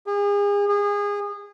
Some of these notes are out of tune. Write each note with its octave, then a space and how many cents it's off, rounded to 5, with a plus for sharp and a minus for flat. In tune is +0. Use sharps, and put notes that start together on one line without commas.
G#4 -35
G#4 -25